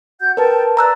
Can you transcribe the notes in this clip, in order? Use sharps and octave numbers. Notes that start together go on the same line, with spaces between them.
F#4 F#5 G6
A#4 B4 G5 A5
B4 D5 A#5 E6 F#6